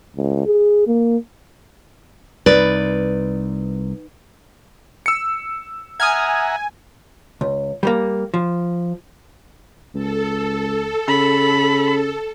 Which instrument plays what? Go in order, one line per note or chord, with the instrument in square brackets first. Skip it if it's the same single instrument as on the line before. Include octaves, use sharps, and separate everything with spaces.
[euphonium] C#2
G#4
A#3
[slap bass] C2 [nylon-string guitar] D#4 B4 D5
[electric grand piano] E6 C#7
[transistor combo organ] E5 F#5 A#5 [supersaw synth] G#5 [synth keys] D#6 F6 G#6
[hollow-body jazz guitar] C#2
G3 A3 A#3
F3
[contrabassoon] C#2 [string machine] A4
[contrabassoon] C#3 [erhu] B5